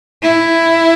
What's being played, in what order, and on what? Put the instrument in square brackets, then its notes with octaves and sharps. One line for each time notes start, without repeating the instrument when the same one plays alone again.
[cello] E4